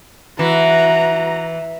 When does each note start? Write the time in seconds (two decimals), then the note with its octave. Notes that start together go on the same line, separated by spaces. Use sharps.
0.39 E3 F#4 A#5